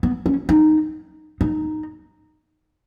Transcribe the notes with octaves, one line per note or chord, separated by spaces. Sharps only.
B3
C#4
D#4
D#4